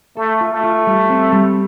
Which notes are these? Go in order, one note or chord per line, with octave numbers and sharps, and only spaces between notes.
A3 A4
F4
A3
F4
G3
C4
G3